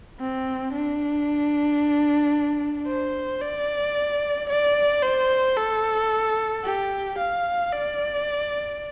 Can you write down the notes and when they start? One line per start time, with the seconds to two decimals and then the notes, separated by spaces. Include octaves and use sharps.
0.20 C4
0.72 D4
2.88 C5
3.42 D5
4.49 D5
5.03 C5
5.57 A4
6.64 G4
7.18 F5
7.73 D5